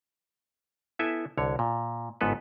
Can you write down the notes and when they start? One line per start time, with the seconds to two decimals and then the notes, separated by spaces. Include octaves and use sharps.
0.99 B3 E4 A4 E5 G#5
1.37 C2 D3 C#5
1.59 A#2
2.21 G1 G#2 B3 A4 B4